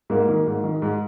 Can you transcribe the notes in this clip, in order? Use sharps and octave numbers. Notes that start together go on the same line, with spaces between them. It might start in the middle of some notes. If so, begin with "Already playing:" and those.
G#2 A#3
D#3
G#2
D#3
G#2